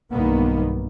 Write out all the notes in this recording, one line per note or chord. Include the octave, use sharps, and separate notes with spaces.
B1 G2 D#3 A#3 B3